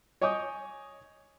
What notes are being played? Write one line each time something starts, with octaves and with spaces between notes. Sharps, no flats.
C#5 D#5 G#5 D6 D#6 G6